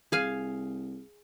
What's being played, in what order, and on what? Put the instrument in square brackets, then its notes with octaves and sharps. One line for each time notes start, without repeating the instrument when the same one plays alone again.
[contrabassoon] C2 [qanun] G#4 F5 G#5